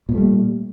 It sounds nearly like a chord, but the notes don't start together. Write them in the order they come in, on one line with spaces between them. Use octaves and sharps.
A#2 B3 A3 G3